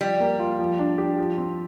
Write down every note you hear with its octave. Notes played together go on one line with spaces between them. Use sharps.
F3 G3
A#3
F4
F3
D4
G4
F3
C4